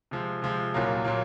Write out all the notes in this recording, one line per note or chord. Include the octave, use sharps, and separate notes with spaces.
C3 F3 G#3
C3 F3 G#3
C2 A#2 F#3 A#3
A#2 F#3 A#3